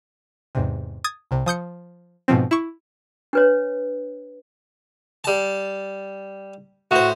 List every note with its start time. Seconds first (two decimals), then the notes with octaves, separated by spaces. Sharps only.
0.55 E2 G#2 C3
1.04 D#6 G#6 A6
1.31 C2 C3
1.46 F3 D#6 G6 C#7
2.28 G#2 B2 F3 C4
2.51 E4 C#6
3.33 D4 B4 C#5
5.24 G3 A5
6.91 A2 F#4 C5